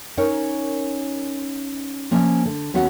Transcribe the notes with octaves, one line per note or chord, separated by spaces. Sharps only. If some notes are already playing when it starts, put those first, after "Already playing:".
C#4 D#4 A#4 C#5
F3 A#3 C#4
D3
D#2 B3 C#4 F#4 F#5